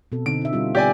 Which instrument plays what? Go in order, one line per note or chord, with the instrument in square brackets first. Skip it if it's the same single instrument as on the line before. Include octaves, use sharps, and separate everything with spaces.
[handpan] B2 C4 A4
[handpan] D3 C4 D#4 [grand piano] D7
[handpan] D#4 E5
G3 C4 F4
[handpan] B3 [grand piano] G4 D5 G#5